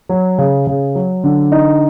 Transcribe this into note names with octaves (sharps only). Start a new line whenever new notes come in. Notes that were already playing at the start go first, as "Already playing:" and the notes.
F#3
C#3
C#3
F#3
D3
D#4